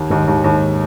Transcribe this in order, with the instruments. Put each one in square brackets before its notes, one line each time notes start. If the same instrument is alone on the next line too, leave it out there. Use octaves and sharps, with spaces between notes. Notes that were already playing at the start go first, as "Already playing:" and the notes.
Already playing: [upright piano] D#2
[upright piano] D#2 [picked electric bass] G#2
[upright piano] D#2 [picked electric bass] G#2
[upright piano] D#2